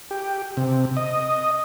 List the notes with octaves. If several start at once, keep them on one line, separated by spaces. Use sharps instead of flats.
G4
C3
D#5